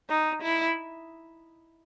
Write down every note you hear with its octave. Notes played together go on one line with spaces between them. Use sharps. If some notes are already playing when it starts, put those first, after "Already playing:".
D#4
E4